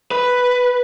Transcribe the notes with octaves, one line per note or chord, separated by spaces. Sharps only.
B4